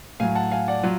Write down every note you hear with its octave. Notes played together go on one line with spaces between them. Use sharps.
A2 F#3 F5 G#5
F#5 A5
F5 G#5
D5 F#5
F#3 F4